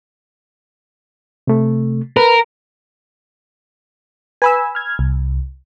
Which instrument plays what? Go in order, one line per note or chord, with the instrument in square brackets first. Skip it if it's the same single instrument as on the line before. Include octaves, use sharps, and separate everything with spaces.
[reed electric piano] C3 A3
[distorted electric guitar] A#4 [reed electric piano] B4
[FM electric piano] B4 [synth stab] G#5 B5 E6
[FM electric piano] F6 G#6
C2